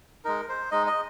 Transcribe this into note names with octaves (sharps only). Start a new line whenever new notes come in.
G#3 D#4 A#4
C5
G#3 D#4 D#5
D#5